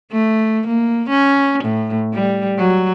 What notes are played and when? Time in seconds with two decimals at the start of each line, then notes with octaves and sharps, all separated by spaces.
0.12 A3
0.67 A#3
1.09 C#4
1.64 A2
2.13 G3
2.58 F#3